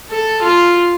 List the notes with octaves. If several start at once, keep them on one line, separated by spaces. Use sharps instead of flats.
A4
F4